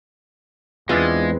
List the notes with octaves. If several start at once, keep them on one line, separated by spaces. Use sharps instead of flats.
E2 G#3 B3 C4 D4 E4 F4 G#4